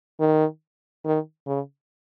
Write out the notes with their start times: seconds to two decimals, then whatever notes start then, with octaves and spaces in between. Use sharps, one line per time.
0.20 D#3
1.05 D#3
1.47 C#3